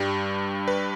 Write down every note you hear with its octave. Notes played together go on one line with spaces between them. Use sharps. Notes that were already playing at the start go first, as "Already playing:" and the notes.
Already playing: G2 G3
B4